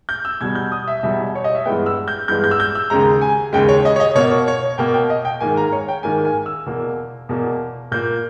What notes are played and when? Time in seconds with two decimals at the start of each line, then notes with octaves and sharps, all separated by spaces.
0.09 G6
0.25 E6
0.41 E2 B2 G3 G#6
0.55 G6
0.72 D#6
0.88 E5
1.03 E2 B2 G3 E5
1.35 C#5
1.44 D#5
1.55 E5
1.66 G2 E3 G#3 B3 G5
1.86 E6
2.08 G6
2.28 G2 E3 G#3 B3 G6
2.44 G6
2.51 E6
2.60 G6
2.75 E6
2.90 D#2 C#3 G#3 A#5
3.21 G#5
3.53 D#2 C#3 G#3 G5
3.68 C#5
3.85 D#5
3.96 C#5
4.00 D#5
4.15 B2 A#3 C#5
4.31 C#5
4.48 C#5
4.78 B2 A#3 G5
4.94 G5
5.10 D#5
5.25 G5
5.40 G#2 D#3 A#3 G#5
5.57 A#5
5.72 C#5
5.88 G5
6.03 G#2 D#3 A#3 G#5
6.25 G#5
6.46 E6
6.66 E2 B2 A#3
7.29 E2 B2 A#3
7.91 A#2 A#3 G6